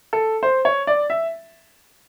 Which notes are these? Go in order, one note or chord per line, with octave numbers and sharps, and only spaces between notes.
A4
C5
C#5
D5
E5